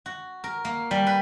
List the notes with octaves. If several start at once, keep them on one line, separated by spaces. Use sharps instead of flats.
F#4
A#4
A#3
G3
B4